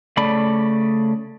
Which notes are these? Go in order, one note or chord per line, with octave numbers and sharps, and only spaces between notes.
C#3 A3 D5 B5